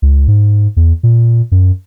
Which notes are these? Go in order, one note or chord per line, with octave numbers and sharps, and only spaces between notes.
C#2
G#2
E2
A#2
F#2